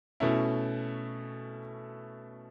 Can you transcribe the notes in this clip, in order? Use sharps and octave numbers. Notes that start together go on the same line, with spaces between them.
B2 A3 C#4 E4